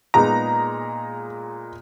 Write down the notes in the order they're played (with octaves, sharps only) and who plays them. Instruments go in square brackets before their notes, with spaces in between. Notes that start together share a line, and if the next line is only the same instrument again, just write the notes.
[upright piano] A#2 G#3 B3 D#4 A#5